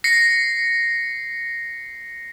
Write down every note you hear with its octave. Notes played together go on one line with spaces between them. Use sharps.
A#6 C7 C#7